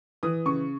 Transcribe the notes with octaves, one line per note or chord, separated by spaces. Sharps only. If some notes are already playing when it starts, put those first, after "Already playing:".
E3 D#6
C#3 C#6